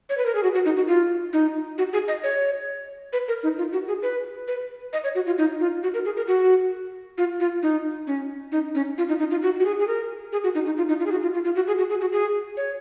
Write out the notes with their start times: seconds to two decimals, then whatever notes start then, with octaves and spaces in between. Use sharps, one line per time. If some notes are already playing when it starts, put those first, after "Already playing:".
0.09 C#5
0.18 B4
0.26 A#4
0.35 G#4
0.43 F#4
0.54 F#4
0.65 D#4
0.77 F#4
0.88 F4
1.33 D#4
1.78 F#4
1.93 G#4
2.08 D#5
2.23 C#5
3.13 B4
3.28 A#4
3.43 D#4
3.58 F4
3.72 F#4
3.88 G#4
4.02 B4
4.48 B4
4.93 D#5
5.04 C#5
5.15 F#4
5.26 F4
5.38 D#4
5.60 F4
5.83 F#4
5.94 A#4
6.05 G#4
6.16 A#4
6.27 F#4
7.18 F4
7.40 F4
7.63 D#4
8.07 C#4
8.52 D#4
8.75 C#4
8.98 F4
9.08 D#4
9.19 D#4
9.30 F4
9.42 F#4
9.60 F#4
9.65 G#4
9.79 G#4
9.87 A#4
10.32 G#4
10.44 F#4
10.55 D#4
10.66 D#4
10.77 F4
10.89 D#4
10.99 F4
11.06 G#4
11.11 F#4
11.22 F4
11.33 F4
11.45 F4
11.55 F#4
11.67 G#4
11.78 F#4
11.89 G#4
12.01 F#4
12.12 G#4
12.57 C#5